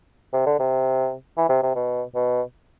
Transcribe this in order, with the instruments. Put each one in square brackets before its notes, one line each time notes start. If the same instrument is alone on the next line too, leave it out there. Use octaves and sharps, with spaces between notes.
[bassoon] C3
D3
C3
E3
C3
C3
B2
B2